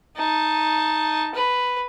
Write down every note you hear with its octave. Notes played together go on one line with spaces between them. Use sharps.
D#4 A5
B4